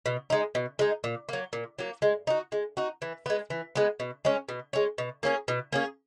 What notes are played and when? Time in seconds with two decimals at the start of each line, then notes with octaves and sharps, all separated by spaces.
0.06 B2
0.30 G#3 D#4
0.55 B2
0.79 G#3 D#4
1.04 A#2
1.29 F#3 A#3
1.53 A#2
1.79 F#3 A#3
2.02 G#3
2.27 D#4 F#4
2.52 G#3
2.77 D#4 F#4
3.02 E3
3.26 G#3 B3
3.50 E3
3.75 G#3 B3
4.00 B2
4.25 G#3 C#4
4.49 B2
4.73 G#3 C#4
4.98 B2
5.23 A#3 C#4 G#4
5.48 B2
5.72 A#3 C#4 G#4